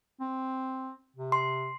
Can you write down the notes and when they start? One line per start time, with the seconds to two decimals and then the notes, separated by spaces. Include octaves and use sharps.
0.20 C4
1.16 C3
1.32 C6